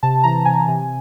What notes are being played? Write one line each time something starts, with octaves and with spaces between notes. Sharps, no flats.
C3 A5
E3 A#5
C3 G#5
C3